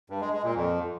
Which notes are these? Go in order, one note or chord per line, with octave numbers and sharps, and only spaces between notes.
G2
G#3
G#3
A#2
F2